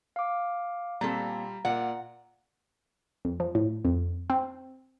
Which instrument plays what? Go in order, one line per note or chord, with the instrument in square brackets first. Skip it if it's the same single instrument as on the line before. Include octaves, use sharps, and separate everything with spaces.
[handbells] F5 D6
[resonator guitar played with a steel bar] A#2 C4 A4 [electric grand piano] G3 [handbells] A#5
[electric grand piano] A#2 D5 F5 [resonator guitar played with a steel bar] F#5
[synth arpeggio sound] F2
F3
A2
F2
C4